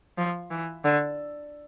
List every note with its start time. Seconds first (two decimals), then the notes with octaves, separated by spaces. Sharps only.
0.18 F3
0.51 E3
0.85 D3